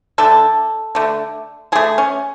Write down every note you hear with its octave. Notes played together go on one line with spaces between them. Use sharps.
D3 A3 A4
D3 A3
D3 A3 G#4
C#4